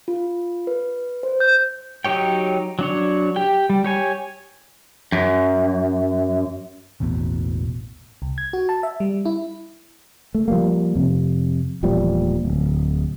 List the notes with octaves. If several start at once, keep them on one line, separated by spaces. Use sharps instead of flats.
F4
B4
C5
G6
F#3 D#4 G4 C#5 G5
F#3 D4 C#5
G4 G5
G3
G4 C#5 G#5
F#2
E1 A1 E2 B2
C2
G#6
F#4
A5
E5
G3
E4
A3
F3 G3 A#3
F2 C3
E1 A#2 F3 G3
D1